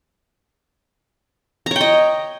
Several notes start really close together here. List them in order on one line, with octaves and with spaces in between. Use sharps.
A#5 C#5 G5 D#5